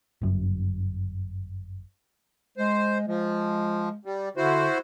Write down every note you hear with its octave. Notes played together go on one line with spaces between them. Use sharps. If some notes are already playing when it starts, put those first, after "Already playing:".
G1 F#2
G#3 C5
F3 G#3
G3
D3 E4 F#4 C5